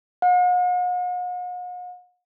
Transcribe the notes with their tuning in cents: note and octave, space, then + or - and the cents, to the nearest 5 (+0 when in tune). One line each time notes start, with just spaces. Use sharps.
F#5 -45